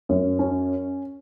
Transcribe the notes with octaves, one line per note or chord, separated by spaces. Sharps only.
F#2
C#4